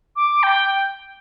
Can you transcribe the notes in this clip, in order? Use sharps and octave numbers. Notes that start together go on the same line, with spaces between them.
D6
G5